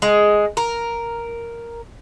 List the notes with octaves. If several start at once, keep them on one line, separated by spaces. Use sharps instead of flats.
G#3
A#4